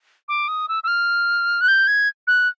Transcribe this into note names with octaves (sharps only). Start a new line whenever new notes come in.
D6
D#6
E6
E6
F6
F#6
G6
G#6
F#6